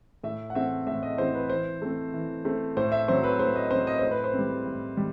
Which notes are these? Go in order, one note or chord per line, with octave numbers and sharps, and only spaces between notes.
A2 E5
F#5
E3 A3 C4 E5
A2 E5
D#5
E3 A3 C4 C5
B4
E3 C5
A3 C4
E3
A3 C4
A2 C5
E5
F#3 C4 C5
B4
A2 C5
D#5
F#3 C4 C5
D#5
A2 C5
B4
C5
G3 C4
A2
G3